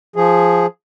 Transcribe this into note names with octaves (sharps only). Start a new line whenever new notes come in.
F3 G#4